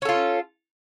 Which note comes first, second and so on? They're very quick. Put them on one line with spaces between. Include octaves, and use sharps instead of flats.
C#4 A4 F4